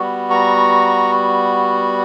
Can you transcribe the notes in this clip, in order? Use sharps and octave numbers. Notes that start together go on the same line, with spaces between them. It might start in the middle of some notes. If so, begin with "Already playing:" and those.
Already playing: G3 B3 F#4
A#5 C#6